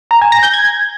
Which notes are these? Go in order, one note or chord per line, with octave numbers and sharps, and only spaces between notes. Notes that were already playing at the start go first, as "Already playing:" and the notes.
A#5
G#5
A#6
G6
G#6